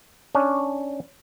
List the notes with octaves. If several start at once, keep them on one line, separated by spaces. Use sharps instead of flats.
C#4 D4